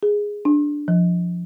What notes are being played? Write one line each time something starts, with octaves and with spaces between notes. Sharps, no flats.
G#4
D4
F3